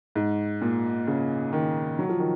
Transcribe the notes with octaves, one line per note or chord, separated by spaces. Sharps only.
G#2
A#2
C#3
D#3
F#3
F3
D#3